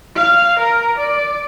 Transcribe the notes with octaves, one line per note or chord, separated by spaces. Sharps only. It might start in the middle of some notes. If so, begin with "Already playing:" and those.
F5
A#4
D5